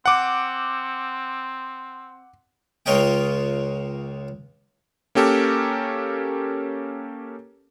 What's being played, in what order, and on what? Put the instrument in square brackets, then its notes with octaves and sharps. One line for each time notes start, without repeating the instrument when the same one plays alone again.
[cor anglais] C4 [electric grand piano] F#5 D6
[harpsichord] C#2 F4 A#4 C#5 D#5 G5
[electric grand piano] A#3 C#4 G4 A4 A#4